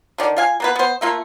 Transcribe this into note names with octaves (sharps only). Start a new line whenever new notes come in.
D3 D#3 D5
F4 F5 G#5
A#3 B3 B4
B3 C5
A3 A#3 F4